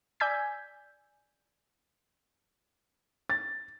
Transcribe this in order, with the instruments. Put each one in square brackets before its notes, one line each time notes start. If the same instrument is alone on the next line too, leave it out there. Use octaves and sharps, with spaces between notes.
[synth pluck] D5 G#5 E6 G6 G#6 B6
[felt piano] A6